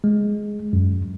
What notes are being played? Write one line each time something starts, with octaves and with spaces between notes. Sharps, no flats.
G#3
F#2